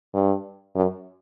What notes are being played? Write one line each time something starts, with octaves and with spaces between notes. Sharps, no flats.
G2
F#2